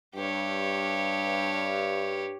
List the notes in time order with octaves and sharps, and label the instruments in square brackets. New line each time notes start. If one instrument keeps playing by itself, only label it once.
[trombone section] G2 [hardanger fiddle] G4 C#5